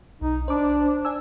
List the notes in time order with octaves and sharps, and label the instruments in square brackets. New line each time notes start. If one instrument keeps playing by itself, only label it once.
[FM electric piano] B1 [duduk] D#4
[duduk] D4 [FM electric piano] C5 D6
[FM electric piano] D5 G#5 E6